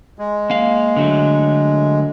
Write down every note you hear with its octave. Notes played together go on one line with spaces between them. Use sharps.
G#3
A#3 F5
D3 F#3 A3